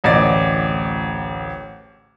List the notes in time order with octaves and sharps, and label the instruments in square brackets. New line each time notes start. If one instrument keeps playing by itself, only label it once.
[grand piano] D1 A1 D5 D#5 A6